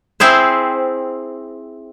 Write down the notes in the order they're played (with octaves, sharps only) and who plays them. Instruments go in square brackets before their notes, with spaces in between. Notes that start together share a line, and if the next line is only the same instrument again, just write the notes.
[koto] C4 E4 G#4 C5